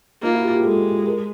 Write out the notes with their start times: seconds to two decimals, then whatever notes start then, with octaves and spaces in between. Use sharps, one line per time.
0.23 A#3 D#4 F4
0.34 E4 F#4
0.44 F4 G4
0.54 F4 G4
0.60 G#4
0.64 G#3 G4 A4
1.05 G#4 A#4